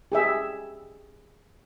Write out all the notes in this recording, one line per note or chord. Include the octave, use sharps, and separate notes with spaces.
G4 G#4 E5